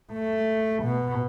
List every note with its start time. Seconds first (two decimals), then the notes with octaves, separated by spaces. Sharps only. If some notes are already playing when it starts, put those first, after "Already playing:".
0.13 A3
0.83 B2